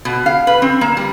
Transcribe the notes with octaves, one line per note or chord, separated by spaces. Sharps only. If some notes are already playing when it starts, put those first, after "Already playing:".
B2
F5
B4
C4
A#3
G3